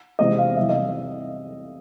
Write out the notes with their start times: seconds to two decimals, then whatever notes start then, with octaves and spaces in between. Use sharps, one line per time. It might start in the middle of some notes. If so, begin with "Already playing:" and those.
0.19 E2 C3 E3 G#3 C4 D#5
0.38 F5
0.57 C3 E3 G3 E5
0.69 D#5